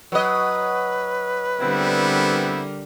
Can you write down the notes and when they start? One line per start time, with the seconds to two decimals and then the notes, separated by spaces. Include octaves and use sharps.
0.12 F#3 B4 D#5
1.60 D3 G3 B3 C4 E4 A#4